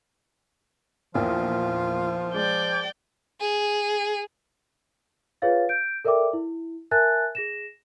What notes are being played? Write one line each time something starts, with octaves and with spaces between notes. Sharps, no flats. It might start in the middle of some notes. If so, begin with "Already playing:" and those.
A#1 E2 A#2 F3 F4
G#3 D5 G5
G#4
F4 G#4 B4 C#5 F5 A6
G6 D7
A4 A#4 D5 E5 G5 D6
E4
A#4 E5 G#5 A5 F#6 A6
G#4 A#6 E7